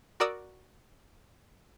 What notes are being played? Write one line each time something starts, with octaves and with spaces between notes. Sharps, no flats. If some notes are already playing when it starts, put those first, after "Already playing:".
F#4 A#4 D5 D#6 E6